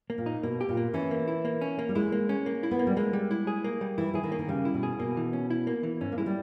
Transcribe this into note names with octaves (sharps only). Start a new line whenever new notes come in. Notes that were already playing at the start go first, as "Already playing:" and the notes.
A#3
A#2
D#4
B2 A#3
G4
A#2
A#3
E3 C#4
A#3
E4
A#3
C#4
A#3
G3
G#3 E4
A#3
C#4
A#3
E4
B3
A#3
G3
G#3 A#3
G3
E4
G#4
A#3
G3
E3 E4
E3 G#4
D#3
A#3
D#3
C#3 G3
E4
B2
G#4
B2 A#3
E3
C#4
E4
A#3
E3
G#2 C#4
A#3
G#3 E4
G3